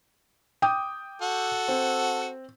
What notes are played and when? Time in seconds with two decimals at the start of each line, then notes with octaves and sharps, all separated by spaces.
0.62 G5 D6 D#6
1.22 F#4 A4
1.68 C4